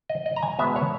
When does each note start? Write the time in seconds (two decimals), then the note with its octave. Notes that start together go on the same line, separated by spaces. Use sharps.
0.09 D#5
0.26 D#5
0.36 A#5
0.43 G#5
0.59 B2 G#3 B3 E5
0.76 C#5